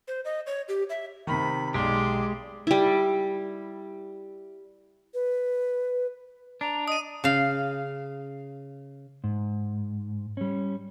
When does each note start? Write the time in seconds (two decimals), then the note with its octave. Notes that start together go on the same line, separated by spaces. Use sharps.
0.08 C5
0.25 D#5
0.47 C#5
0.68 G4
0.90 E5
1.27 C3 D#3 B5
1.74 B1 G#3 G4 D5 C6
2.67 G3 E4
5.14 B4
6.61 D4 A#5
6.88 D#5 D#6 D#7
7.24 C#3 F5
9.24 G#2
10.37 G3 C#4